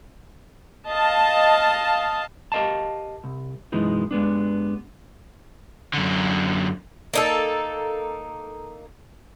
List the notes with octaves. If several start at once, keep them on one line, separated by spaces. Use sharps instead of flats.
D#5 F5 A5
G4 A#4 D#5 F5 A5
C2
F#2 B2 E3 G#3 B3 D#4
G2 G#3 B3 D4
F#2 D3
A#3 D#4 A4